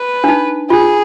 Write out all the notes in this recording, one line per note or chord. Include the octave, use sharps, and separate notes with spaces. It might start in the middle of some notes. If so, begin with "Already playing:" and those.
Already playing: B4
D4
D#4
F4 G#4